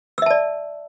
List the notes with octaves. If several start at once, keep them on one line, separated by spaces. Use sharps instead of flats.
D5 E5 A5 E6